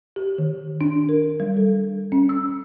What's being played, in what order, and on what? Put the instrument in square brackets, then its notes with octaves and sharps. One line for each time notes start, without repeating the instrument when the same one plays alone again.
[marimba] G4
D#3
D4
A#4
G3
A4
C#4
E6